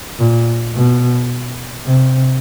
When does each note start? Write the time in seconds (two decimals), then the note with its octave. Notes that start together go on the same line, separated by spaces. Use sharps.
0.19 A#2
0.75 B2
1.86 C3